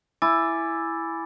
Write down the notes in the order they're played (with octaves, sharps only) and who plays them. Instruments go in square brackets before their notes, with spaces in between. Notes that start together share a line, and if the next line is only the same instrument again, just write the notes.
[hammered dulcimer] E4 [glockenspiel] G#5 D6 A6